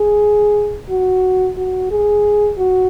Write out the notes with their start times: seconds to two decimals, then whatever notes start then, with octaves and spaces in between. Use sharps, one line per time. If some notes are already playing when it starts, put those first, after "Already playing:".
Already playing: G#4
0.90 F#4
1.57 F#4
1.91 G#4
2.58 F#4